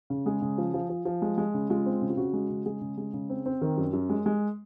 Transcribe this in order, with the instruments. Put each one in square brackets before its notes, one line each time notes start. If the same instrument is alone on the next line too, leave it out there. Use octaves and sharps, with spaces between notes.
[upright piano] C#3
G#3 G#4
C#3
F3
F3
F3
F3
G#3
G#3
C#3
G#3 F4
C4
C#3
F4
C#3 F#4
G#3
C#3
G#3 G#4
C#3
G#3
C#3
C4
C4
D#3 A#4
F#2
F#2
G#3
G#3